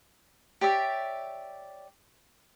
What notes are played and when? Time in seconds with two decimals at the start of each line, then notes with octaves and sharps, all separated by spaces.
0.61 G4 C#5 D5 E5